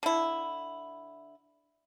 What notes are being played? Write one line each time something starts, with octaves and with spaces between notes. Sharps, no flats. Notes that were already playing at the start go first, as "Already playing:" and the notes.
D3 E4